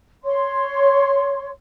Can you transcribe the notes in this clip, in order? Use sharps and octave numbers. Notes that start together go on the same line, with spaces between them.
C#5 C6